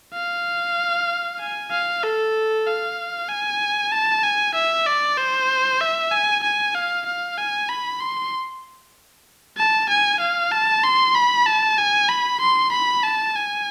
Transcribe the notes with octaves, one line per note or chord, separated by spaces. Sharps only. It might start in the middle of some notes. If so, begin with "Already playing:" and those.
F5
G#5
F5
A4
F5
G#5
A5
G#5
E5
D5
C5
E5
G#5
G#5
F5
F5
G#5
B5
C6
A5
G#5
F5
A5
C6
B5
A5
G#5
B5
C6
B5
A5
G#5